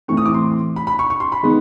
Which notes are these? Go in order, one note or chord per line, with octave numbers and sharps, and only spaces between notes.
A2 E3 A3 C4 C#6
D#6
D6
C6
B5
B5
C#6
C#6
C6
B5
D#3 G#3 B3